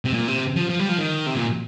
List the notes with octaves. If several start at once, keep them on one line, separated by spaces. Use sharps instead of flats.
C3
A#2
C3
F3
F3
G3
F3
D#3
C3
A#2